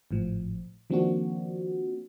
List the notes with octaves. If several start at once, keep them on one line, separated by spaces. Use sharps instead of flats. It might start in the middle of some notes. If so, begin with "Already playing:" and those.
G#1 A2 F3
D#3 F3 A#3 C4 D4 F#4